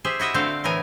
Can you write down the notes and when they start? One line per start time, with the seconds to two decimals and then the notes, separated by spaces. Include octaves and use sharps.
0.04 G4 G#4 C5 E5
0.19 E4 F#4 D#5 E5
0.34 D3 A3 C4 C5 D5 F5
0.64 A2 E3 B3 A#4 G#5